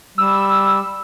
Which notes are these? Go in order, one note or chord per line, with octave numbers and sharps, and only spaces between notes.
G3 E6